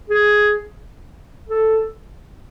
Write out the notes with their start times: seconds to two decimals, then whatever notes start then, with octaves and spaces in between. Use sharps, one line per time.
0.10 G#4
1.49 A4